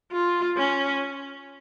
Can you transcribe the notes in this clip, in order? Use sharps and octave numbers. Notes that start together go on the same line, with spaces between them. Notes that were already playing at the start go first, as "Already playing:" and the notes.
F4
C#4